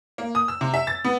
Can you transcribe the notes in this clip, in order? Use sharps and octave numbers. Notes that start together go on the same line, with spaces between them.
A#3
D#6
E6
C3
E5
A6
B3